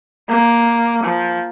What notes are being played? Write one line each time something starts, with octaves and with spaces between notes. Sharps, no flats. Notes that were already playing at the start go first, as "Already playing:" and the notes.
A#3
F3